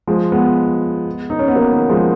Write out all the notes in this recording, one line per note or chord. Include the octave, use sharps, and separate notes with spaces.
F3 G#3
G#3 B3
D#4
C#4
B3
F#3 A#3
D#3
F3 G#3